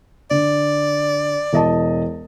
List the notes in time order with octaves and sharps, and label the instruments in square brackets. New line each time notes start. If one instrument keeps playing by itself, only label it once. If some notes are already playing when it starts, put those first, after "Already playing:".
[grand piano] D3 [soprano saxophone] D5
[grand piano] E1 D#5 A5